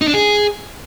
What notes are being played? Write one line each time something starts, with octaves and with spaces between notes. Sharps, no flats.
D#4
D4
G#4